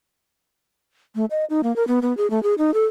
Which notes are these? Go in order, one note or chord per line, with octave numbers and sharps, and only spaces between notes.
A3
D#5
D#4
A#3
A#4
B3
B3
G#4
A3
G#4
D#4
A4